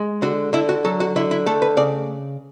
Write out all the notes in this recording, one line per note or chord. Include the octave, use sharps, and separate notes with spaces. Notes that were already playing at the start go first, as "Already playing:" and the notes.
Already playing: G#3
D3 F#4
D3 E4
F#4
F#3 A4
F#4
D3 E4
E4
A3 A4
B4
C#3 D5